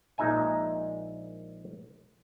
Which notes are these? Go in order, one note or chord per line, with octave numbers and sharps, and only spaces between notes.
A#1 A#2 G#3 D#4 E5 G#5